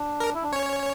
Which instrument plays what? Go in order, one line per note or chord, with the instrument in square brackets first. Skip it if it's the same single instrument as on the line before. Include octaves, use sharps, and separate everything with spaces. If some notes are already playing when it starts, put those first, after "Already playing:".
Already playing: [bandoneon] D4
[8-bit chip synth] A#4
[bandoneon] E4
D4
[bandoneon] C#4 [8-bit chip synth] C#5